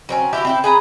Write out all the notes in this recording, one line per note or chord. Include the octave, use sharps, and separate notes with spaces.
F#3 C4 C#4
E4 F#4 G4
C4 E4 G4
G#4 B4 A#5